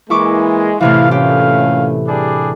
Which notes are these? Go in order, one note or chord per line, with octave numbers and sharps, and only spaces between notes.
E3 G#3 A#3 E4 C#6 D6
A2 C3 E3 E4 F5
A#2 A3 C#4 G4 F5
G3 D4 G#4